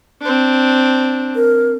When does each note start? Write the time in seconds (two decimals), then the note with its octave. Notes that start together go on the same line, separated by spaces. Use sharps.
0.21 C4 D4
1.36 A#4